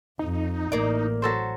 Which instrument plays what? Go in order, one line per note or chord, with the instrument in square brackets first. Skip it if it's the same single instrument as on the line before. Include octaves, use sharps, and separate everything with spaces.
[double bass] F2 [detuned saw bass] D#4
[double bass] A1 [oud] A#3 D5
[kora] F#3 A4 C5